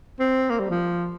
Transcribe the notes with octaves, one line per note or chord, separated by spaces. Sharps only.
C4
A#3
G3
F3